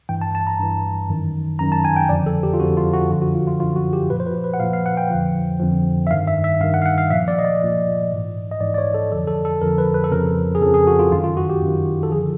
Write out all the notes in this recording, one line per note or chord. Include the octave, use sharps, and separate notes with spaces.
G2 E3 G5
A5
A5
A#5
G2 E3
F#2 D#3
F#2 D#3 A#5
A5
G#5
G5
F2 D3 F3 D5
A4
G4
F4
F2 D3 F3 F#4
F4
F#4
F#2 D3 F3
F#4
F4
F4
F#2 D3 F3 F4
F#4
G4
A#2 F3 B4
C5
B4
B4
F#5
A#2 F3 F5
F5
F#5
G5
F2 D3 F3
F2 D3 F3
E5
G2 D#3 F5
E5
E5
G2 D#3 F5
F#5
F5
F#5
F5
A#2 F3 E5
D5
D#5
D5
A#2 F3
G#2 E3
D#5
G#2 E3 D5
D5
C#5
A4
F2 D3 F3 A4
A4
A4
F2 D3 F3 A#4
B4
B4
A4
F2 C#3 F3 A#4
G#4
F2 C#3 F3 A4
G#4
F#4
F4
F#2 D#3 F4
F4
F#4
G4
F#2 D#3
A4
D3 F3 G#4